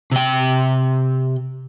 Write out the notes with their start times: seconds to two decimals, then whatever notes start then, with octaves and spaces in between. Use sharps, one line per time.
0.12 C3 G5